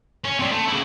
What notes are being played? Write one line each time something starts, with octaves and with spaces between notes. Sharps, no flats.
C#4
G3 C4
A3
C#3 E4